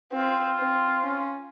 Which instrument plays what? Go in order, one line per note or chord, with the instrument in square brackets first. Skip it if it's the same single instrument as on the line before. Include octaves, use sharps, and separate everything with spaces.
[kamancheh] C4 [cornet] F4
[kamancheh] C4
C#4